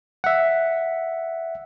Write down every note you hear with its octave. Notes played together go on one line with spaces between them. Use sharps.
E5 F#5